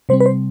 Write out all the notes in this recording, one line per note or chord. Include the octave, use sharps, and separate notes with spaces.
C3 G3 C4 C5
B4
C5